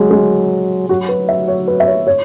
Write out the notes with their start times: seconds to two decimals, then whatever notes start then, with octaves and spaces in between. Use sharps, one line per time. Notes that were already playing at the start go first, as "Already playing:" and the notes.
Already playing: F#3 G#3
0.11 G#3
0.89 F#3 F#4
1.09 B4
1.29 E5
1.48 C#5
1.67 B4
1.80 E5
1.87 C#5
2.07 C#5